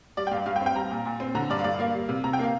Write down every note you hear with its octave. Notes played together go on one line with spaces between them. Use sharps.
G3 D5
G5
G2 F5
G2 F5
G5
C4
G5
G3 A#5
A#2
A#2
C4
D3 A#5
G2 D5
F5
G2 D5
A#3 F5
G3
C3
C3 A#5
G5
A#3 F5